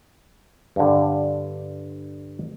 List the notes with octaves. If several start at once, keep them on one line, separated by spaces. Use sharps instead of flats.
G2 D3